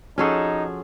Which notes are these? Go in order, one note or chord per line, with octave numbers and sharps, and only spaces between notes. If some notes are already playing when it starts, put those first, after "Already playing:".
F3 C#4 D#4 F#4 G#4 A4